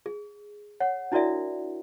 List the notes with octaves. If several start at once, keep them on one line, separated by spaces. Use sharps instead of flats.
G#4
C#5 F#5
D4 E4 F#4 A#4 D5 E5